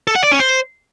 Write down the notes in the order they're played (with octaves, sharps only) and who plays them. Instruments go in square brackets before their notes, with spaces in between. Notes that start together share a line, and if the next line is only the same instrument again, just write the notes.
[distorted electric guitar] A4
F#5
D5
C#4
C5